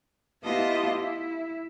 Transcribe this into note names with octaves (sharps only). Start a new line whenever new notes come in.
B3 E4 F4 G4 D#5 A5
E4